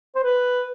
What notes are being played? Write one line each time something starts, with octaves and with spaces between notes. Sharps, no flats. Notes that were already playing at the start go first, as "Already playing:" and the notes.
C5
B4